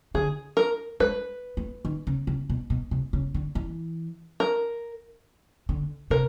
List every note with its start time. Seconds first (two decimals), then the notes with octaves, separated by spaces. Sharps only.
0.14 D3 G#4
0.57 A#4
1.00 G#3 B4
1.57 A3
1.85 D#3
2.07 C#3
2.27 C#3
2.50 B2
2.70 B2
2.91 C3
3.13 C#3
3.34 D3
3.55 E3
4.40 A#4
5.69 D3
6.10 C3 A#4